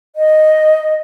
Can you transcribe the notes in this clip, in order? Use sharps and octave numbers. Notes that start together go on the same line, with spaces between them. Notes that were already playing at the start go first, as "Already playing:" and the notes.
D#5